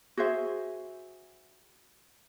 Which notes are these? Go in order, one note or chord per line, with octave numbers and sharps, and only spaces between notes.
F#4 G#4 C5 E5